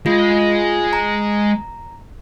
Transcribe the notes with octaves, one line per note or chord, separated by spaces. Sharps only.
G#3 F4
A#5